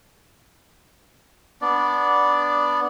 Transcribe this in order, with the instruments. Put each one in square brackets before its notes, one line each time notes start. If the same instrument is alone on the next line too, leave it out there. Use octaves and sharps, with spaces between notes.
[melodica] B3 D4 D5